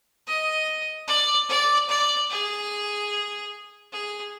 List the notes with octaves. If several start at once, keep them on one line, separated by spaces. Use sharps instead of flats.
D#5
D5
D5
D5
G#4
G#4